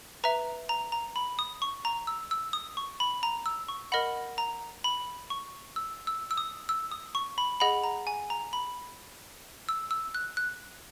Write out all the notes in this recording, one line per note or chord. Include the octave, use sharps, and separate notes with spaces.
B4 E5 A#5
A#5
A#5
B5
D#6
C#6
A#5
E6
E6
D#6
C#6
B5
A#5
E6
C#6
A#4 D#5 F#5 B5
A#5
B5
C#6
E6
E6
E6
D#6
E6
D#6
C#6
B5
G#4 D#5 F#5 B5
A#5
G#5
A#5
B5
E6
E6
F#6
F#6